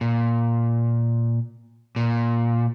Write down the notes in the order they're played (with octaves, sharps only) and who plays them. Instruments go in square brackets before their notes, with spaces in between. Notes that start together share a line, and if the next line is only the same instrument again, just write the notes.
[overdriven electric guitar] A#2
A#2